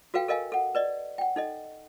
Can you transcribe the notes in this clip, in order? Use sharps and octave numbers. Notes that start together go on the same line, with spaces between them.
F#4 A4 B4 F5 G5
A4 A#4 D#5 F5 G#5
A4 F#5
B4 D5 D#5
F#5 G5
D#4 A4 D#5